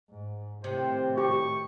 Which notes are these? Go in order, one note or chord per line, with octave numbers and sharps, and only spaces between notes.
G#2
A2 C3 D#3 C5
G4 C#6